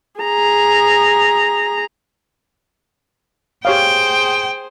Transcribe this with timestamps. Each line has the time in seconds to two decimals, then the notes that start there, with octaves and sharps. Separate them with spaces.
0.20 G#4 A#5
3.65 G4 G#4 C5 C#5 F5 G5